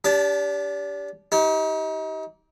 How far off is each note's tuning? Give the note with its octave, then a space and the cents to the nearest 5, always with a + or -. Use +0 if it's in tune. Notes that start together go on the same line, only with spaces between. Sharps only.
D4 -35 G4 +5 A5 +0
D#4 +35 G4 -15